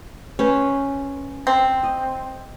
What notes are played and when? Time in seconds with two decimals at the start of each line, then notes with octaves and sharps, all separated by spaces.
0.39 C#4 B4 C5
1.47 C4
1.83 D#5